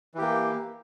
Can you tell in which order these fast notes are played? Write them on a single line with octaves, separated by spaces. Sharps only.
E3 G4 A#3